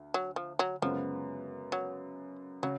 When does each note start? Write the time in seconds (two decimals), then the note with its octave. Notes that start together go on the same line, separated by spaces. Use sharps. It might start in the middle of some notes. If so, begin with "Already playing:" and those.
Already playing: D2
0.14 F#3
0.36 F3
0.59 F#3
0.82 F#2 C#3 F3 G#3 B3
1.72 F#3
2.63 C#3 F#3